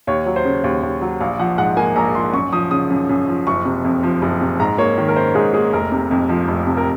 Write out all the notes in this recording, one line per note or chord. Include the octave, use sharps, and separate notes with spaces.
D#2 C#5
F#3
C5
C#3
D#2
D#2
F#3
A#1 F5
F3 F#5
G#2 F#5
A#3 G#5
A#1 A#5
F3 C6
F#2 C#6
F3 D#6
C#3 D#6
F#2
F#2
F3
F#1 C#6
C3
F2
F3
F#1
C3
G#2 A#5
A#3 C#5
D#3
A#4
C#4 C5
G#2 G#4
A#3 G#4
F1 A#4
C3
F2
F3
F1
C3
A#4